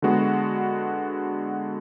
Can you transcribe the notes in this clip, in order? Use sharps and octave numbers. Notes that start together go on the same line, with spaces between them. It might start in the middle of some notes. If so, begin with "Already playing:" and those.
D3 G#3 B3 F#4